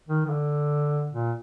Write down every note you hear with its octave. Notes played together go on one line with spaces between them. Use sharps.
D#3
D#3
D3
A#2